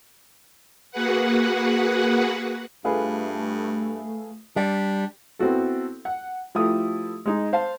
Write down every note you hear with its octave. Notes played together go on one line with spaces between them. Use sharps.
A#3 F#4 G#4 B4 F#5
G2 A3 F4 G#4 B4
G3 D4
B3 C4 E4 F#4 A4
F#5
F3 A3 E4 G4 A4 D#6
G#3 D#4
C5 F5 A5